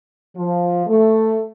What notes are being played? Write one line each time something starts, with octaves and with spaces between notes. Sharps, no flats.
F3
A3